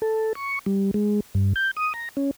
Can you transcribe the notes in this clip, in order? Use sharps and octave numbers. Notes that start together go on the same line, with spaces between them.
A4
C#6
G3
G#3
G2
G6
D#6
A#5
C#4